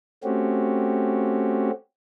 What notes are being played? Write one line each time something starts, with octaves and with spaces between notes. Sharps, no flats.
A3 C4 C#4 F#4 G4